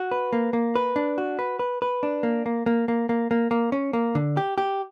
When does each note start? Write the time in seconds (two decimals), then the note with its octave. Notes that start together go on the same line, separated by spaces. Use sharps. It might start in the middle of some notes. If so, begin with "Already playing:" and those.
Already playing: F#4
0.11 B4
0.33 A#3
0.53 A#3
0.76 B4
0.96 D4
1.18 F#4
1.39 B4
1.59 B4
1.82 B4
2.03 D4
2.23 A#3
2.46 A#3
2.66 A#3
2.88 A#3
3.09 A#3
3.31 A#3
3.51 A#3
3.72 C#4
3.93 A#3
4.15 D3
4.37 G4
4.58 G4